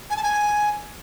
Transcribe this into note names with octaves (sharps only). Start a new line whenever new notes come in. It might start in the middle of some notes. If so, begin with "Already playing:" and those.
G#5
A5
G#5